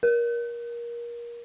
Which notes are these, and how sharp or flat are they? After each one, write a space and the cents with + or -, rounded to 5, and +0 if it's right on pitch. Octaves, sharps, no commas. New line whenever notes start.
A#4 +25